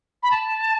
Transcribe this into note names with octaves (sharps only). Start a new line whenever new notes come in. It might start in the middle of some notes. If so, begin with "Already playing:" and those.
B5
A5